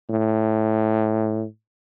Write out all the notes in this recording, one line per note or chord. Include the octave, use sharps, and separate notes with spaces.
A2